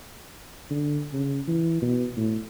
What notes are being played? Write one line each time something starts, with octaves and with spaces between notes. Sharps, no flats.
D3
C#3
E3
B2
A2